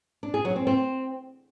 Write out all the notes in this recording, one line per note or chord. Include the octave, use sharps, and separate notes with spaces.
D4
G#4
F#3
C4
C4